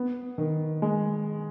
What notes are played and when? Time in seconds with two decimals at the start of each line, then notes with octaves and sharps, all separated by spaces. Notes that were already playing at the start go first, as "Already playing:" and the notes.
Already playing: B3
0.38 D#3
0.82 G#3